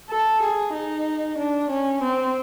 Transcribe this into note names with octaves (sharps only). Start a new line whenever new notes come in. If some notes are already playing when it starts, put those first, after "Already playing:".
A4
G#4
D#4
D4
C#4
C4